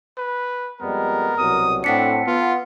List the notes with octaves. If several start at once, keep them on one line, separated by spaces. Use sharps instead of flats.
B4
F2 G3 G#3 B3 A#4
C2 B2 F#3 D#6
A2 C4 D4 A4 F#5 B6 C#7
B3 F4